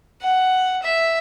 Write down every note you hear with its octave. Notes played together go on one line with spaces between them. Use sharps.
F#5
E5